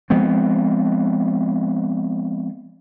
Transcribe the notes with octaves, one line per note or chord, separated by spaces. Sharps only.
F3 G#3 B3 C4